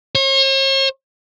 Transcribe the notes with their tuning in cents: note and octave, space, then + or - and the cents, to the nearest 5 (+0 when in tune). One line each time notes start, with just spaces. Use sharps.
C#5 -45